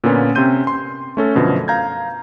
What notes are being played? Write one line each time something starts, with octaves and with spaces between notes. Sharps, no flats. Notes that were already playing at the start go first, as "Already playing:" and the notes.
A#2 D3 B3 C#4 F4
C3 C4 C#4 C6 G6 D#7
C6
A3 C#4 A4
F#2 B2 D3 F3
F5 A#5 G6 G#6